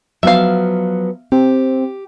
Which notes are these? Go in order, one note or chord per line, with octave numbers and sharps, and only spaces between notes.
F3 F#3 B3 E5 F5
C4 G4